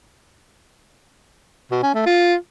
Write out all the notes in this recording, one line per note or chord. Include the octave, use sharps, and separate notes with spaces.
B2
C#4
A3
F4